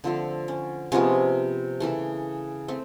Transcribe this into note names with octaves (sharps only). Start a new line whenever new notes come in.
D3 F3 A3 C4
C#4
C3 F3 G#3 B3 C#4
C#3 E3 A3
A3 C4